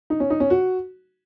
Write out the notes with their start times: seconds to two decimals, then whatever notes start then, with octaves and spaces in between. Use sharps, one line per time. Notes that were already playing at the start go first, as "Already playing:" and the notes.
0.10 D#4
0.20 C#4
0.30 D#4
0.40 C#4
0.50 F#4